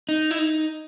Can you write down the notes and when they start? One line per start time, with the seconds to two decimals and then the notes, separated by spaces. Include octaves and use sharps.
0.09 D#4
0.31 E4
0.38 D#4